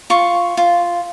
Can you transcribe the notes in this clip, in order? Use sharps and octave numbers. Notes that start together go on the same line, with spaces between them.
F4 C#6
F4